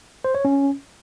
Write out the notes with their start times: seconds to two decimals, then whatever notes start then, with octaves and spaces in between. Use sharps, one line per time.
0.24 C5
0.35 C#5
0.45 C#4